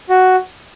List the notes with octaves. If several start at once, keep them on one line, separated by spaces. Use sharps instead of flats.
F#4